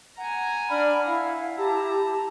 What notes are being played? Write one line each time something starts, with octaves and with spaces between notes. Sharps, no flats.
F#5 G#5 A#5
D4 D5 B5 F6
E4 F5
G4 A5 A#5